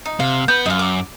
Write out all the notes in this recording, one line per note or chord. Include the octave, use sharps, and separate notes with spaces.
D#4
C3 F5
B3 B4 G6
F#2 D#4 F4
D6